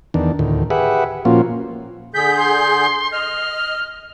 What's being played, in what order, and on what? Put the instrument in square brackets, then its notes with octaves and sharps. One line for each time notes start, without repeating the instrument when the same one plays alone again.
[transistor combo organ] E2 D#3 D4
D2 A2 D#3
G4 G#4 B4 E5 F#5
A#2 F3 A#3 C#4 F4 F#4
[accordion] D3 G#4 G6 [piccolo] B6
[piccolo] C6
[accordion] D#5 [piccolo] F6